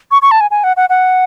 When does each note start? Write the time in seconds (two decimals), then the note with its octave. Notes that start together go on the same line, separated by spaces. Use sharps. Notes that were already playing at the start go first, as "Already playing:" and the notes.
0.11 C#6
0.22 C#6
0.31 A5
0.41 G#5
0.51 G#5
0.64 F#5
0.77 F#5
0.90 F#5